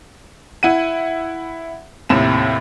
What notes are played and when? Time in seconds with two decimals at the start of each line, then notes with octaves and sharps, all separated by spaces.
0.63 E4 F#5 D#7
2.09 D#2 A2 C3 E7